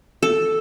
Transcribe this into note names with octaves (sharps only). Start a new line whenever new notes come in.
A4